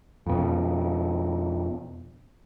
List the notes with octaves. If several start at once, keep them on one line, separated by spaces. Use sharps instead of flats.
F2 B2